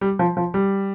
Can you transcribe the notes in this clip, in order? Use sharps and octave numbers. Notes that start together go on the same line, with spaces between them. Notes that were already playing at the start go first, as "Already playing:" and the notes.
G3
F3
F3
G3